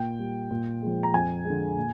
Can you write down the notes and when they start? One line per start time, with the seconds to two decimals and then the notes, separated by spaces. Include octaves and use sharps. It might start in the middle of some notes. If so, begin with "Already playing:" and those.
Already playing: A#2 G5
0.19 G3
0.50 A#2
0.82 F3 G#3
1.03 A#5
1.14 F2 G#5
1.45 D3 G#3
1.77 A#2